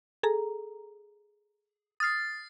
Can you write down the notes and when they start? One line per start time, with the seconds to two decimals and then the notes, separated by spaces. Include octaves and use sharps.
0.23 G#4 A4 A#5
2.00 D#6 F6 A6 C7